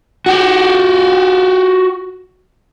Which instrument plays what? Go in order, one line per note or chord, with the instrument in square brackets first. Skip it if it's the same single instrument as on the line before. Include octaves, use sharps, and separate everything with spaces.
[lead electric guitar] F#4 G4